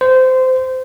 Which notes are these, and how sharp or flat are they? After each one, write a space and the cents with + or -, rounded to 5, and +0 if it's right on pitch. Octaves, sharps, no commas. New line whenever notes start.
C5 -20